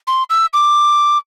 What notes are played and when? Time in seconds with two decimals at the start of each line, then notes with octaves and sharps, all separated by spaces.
0.07 C6
0.30 E6
0.53 D6